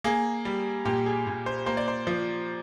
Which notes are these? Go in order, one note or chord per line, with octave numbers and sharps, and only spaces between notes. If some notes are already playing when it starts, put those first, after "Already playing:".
A#3 G#4
G3
A#2 G4
G#4
A#2
C5
A#3 C5
D5
C5
F3